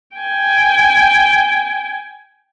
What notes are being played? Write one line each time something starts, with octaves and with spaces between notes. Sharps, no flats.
G5 G#5